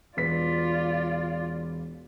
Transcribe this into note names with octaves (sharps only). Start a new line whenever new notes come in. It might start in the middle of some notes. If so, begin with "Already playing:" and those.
E1 F4 B4 D5 B6